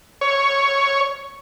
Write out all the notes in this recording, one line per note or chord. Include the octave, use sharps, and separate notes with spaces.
C#5